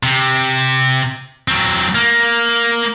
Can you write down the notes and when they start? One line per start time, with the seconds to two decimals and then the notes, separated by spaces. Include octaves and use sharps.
0.03 C3
1.48 F#3 C4
1.95 A#3